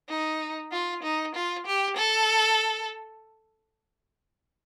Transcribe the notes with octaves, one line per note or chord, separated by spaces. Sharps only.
D#4
F4
D#4
F4
G4
A4